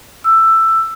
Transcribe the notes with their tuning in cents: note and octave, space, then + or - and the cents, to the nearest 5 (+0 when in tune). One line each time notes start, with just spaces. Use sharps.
E6 +10